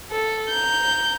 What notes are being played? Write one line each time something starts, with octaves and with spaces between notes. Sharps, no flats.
A4
A#5 G6